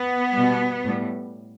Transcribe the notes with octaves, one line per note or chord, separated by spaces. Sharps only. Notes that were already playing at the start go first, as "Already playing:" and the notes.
Already playing: B3
B2 G3
A2 G3